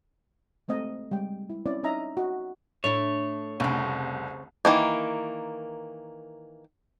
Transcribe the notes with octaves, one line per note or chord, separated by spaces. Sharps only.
G#3 A3 C4 D#5
G3 G#3 G5
E4
C4 C#4 E4 D5
C#4 D#4 D#5 E5 A#5
F#4 D#5
A2 A3 D4 E4 C#5
F1 C2 C#3 C4
D#3 E3 A#3